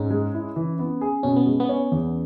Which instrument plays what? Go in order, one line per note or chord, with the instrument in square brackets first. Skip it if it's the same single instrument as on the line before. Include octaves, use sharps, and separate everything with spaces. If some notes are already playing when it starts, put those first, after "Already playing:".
Already playing: [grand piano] G#2 [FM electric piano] C#4
[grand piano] G#3
E4
E3
B3
G#4
[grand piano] B2 [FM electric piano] C#4
[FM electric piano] B3
[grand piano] G#3
[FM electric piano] B3
[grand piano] C#4
E2